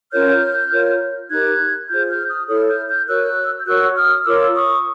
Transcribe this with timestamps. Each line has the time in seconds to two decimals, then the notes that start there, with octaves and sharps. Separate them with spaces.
0.12 C#4 F4 A#4 C#5 F6 G6
0.72 F4 A#4 C#5
1.30 D#4 G4 A#4 F#6 G#6
1.89 F4 G#4 C5 F6 G6
2.09 F6 G6
2.29 D#6 F6
2.48 E4 A4 C#5 D#6 F6
2.67 F6 G6
2.88 F6 G6
3.08 F#4 A#4 C#5 E6 F#6
3.59 G6
3.66 F#4 A#4 C#5 E6 F#6
3.96 D#6 F6
4.25 F4 A#4 C#5 D6 E6
4.55 C#6 D#6